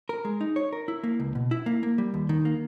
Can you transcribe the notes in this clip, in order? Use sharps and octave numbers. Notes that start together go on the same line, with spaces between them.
A#4
G#3
D#4
C#5
A#4
E4
A#3
C#2
B2
E4
A#3
A#3
G3
D#2
D#3
A#3